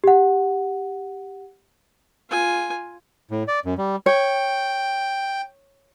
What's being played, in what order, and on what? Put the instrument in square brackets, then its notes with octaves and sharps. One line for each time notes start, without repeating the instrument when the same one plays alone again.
[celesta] G4 F#5
[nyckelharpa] F4 G#5
[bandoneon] A2
D5
F#2
G3
[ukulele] C#5 [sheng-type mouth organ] G5